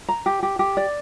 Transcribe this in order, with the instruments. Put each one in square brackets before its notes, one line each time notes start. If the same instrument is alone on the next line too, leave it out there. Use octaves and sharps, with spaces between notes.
[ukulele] A#5
G4
G4
G4
D5